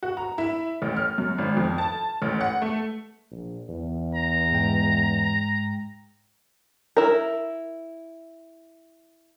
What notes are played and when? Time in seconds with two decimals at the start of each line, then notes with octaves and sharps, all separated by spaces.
0.03 F#4
0.17 A#5
0.38 E4
0.82 A1
0.97 F6
1.18 F#2
1.38 G#1
1.57 F2
1.78 A5
2.22 A1
2.41 F#5
2.62 A3
3.31 A#1
3.69 E2
4.15 A#5
4.52 G#2 G#3 G5
6.97 E4 A#4